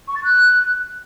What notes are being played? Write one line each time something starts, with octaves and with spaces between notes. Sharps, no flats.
C#6
A6
F#6